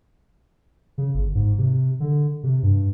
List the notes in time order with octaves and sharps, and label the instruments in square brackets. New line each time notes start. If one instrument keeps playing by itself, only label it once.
[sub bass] C#3
G1
G#2
C3
D3
C3
G2